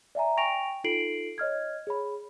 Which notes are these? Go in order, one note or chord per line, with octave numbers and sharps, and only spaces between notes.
D5 E5 G#5 A#5
G5 G#5 C#6 A#6 D7 F7
D#4 F4 A4 C7 D7 F#7
C#5 D#5 F6 G#6
G#4 C#5 B5